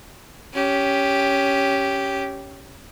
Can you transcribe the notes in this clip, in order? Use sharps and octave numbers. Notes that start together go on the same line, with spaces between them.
C#4 G4